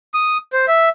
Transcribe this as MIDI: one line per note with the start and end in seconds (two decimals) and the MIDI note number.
0.14 0.37 87
0.53 0.66 72
0.68 0.89 76